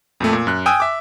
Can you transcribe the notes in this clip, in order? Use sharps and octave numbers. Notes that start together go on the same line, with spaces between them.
F2 A#2 A3
A#2
F#2 F#6
G5 G#5 D#6 E6 F#6
E5 D6